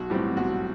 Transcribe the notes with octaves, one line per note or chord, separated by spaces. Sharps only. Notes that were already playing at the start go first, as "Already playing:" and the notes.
Already playing: B1 F#4
A2 E3 G3 C4
B1 F#4